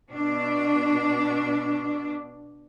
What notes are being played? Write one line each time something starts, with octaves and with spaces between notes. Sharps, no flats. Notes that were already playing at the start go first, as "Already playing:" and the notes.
B2 D4